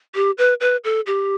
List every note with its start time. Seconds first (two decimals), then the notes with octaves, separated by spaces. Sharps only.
0.15 G4
0.38 B4
0.61 B4
0.84 A4
1.07 G4